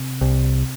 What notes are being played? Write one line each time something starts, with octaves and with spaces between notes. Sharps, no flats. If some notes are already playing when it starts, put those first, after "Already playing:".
Already playing: C3
C2